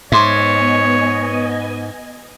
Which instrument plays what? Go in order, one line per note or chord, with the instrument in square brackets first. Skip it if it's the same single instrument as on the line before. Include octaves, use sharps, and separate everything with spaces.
[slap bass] G#2 [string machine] B3 D#5 G#5 [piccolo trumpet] C#5 [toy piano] E5 C6 D6